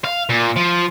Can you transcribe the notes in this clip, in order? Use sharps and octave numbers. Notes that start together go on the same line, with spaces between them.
F5
A#2
F3